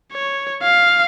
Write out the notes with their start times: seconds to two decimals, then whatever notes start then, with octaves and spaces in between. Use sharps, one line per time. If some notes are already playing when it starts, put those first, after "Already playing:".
0.12 C#5
0.62 F5